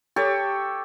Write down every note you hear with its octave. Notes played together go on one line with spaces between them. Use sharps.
G4 A4 C#5